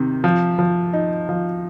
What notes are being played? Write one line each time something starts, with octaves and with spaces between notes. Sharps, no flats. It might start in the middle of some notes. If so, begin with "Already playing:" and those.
Already playing: C3 D#3
F3
F3
D#4
F3